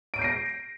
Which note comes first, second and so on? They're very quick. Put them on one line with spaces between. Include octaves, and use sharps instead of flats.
D7 D#7 G6 C7 A#6